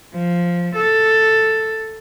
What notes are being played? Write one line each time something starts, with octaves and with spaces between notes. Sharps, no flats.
F3
A4